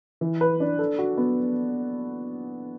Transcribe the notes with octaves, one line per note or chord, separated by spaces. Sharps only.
E3
B4
D4
A4
F#4
B3